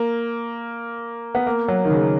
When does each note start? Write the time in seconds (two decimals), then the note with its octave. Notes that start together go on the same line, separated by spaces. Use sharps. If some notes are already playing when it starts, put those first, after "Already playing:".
Already playing: A#3
1.35 B3
1.46 A#3
1.68 F#3
1.85 D#3
1.90 C#3